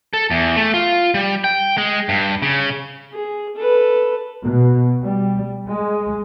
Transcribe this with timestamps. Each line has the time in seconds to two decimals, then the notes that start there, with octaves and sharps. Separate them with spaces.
0.14 A4
0.31 E2
0.56 A3
0.74 F4
1.14 G3
1.44 G5
1.78 G#3
2.09 G2
2.42 C#3
3.12 G#4
3.56 A4 B4
4.45 B2
5.03 G3
5.69 G#3